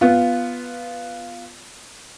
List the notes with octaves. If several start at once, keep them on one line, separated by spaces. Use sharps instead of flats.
B3 F4